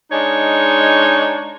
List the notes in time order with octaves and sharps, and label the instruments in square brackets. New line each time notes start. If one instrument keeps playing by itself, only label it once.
[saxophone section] G#3 D4 D#4 C#5